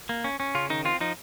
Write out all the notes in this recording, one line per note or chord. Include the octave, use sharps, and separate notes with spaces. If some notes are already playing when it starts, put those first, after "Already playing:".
A#3
C#4
C#4
C#3 F4
D#3 D#4
C4 F4
F3 D#4